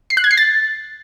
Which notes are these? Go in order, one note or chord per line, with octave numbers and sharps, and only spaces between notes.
C7
F#6
G#6
C7
A6